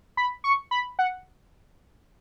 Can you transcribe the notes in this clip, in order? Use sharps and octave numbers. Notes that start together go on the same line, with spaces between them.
B5
C#6
B5
F#5